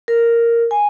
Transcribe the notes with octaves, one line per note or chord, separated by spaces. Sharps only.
A#4
G#5